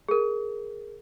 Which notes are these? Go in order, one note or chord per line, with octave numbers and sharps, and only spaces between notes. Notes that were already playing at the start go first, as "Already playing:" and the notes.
G#4 A#4